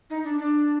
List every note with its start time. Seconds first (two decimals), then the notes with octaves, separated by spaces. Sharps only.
0.10 D#4
0.24 D4
0.38 D4